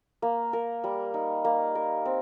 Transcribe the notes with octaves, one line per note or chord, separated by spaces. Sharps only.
A#3
A#4
G3
D#4
A#3
A#4
C4